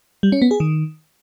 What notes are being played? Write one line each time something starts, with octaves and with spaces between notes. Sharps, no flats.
G3
C#4
B3
G#4
D#3